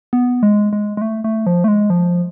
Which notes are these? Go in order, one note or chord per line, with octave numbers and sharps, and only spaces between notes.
B3
G#3
G#3
G#3
A3
A3
F3
A3
G#3
F3